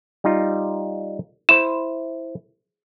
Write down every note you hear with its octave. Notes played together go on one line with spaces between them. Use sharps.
G3 D#4 F4
E4 C5 E7